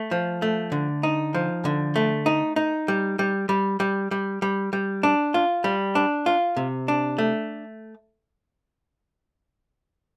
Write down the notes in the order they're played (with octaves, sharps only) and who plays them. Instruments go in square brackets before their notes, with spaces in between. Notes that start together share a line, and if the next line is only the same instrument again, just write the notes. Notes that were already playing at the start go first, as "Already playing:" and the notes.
Already playing: [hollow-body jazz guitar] A3
F3
A3
D3
D#4
F3
D3
A3
D#4
D#4
G3
G3
G3
G3
G3
G3
G3
D4
F4
G3
D4
F4
C3
D4
A3